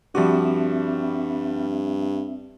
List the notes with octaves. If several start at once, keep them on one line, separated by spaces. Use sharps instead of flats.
G2 F3 G3 C4 F#4 E5 D6